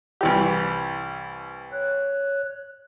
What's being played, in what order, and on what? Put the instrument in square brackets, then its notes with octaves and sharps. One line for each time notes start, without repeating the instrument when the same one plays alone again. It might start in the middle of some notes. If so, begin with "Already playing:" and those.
[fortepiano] C2 E3 G4
[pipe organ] C#5 F#6